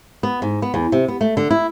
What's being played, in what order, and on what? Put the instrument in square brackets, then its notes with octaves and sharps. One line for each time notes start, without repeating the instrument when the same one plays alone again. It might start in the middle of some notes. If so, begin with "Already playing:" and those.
[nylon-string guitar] B3
G#2
B3
E2
C3
B3
A3
D3
E4